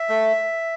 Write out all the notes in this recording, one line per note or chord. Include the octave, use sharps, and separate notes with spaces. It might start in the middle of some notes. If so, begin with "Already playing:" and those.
Already playing: E5
A3